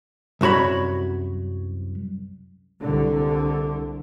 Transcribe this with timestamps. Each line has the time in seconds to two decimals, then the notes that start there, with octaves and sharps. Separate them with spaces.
0.41 C2 F#2 F#4 C#5 B5
2.80 C2 D3